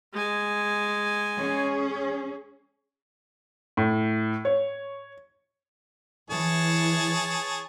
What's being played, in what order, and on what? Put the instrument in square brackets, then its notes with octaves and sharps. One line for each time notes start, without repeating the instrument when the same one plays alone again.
[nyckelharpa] G#3 G#5
[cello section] C#4 G#4
[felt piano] A2
C#5
[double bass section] E3 [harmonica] G#4 C#5 A5